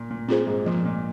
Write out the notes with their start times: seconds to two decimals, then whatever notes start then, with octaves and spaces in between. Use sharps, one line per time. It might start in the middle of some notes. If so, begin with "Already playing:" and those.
Already playing: A#2
0.10 A#2
0.28 A#2 C4 F4 G#4 C5
0.47 G#2
0.66 A#2 F3
0.85 A#2